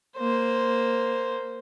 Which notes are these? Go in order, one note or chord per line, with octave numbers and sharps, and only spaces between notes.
A#3 C5